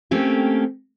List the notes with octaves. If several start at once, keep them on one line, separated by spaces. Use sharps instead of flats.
A3 A#3 C4 C#4 G4